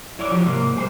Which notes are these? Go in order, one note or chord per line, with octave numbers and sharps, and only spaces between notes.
F#2 E4 C#5 D5
F3 F#4 G4
G#2 C3 A#3
G3 G#4 C5